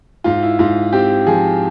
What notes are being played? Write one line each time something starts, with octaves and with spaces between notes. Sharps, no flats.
G#2 F4
E4
G#2 F4
C4 G4
F3 G#4